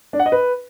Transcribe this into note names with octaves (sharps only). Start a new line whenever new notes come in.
D4
F#5
D#5
B4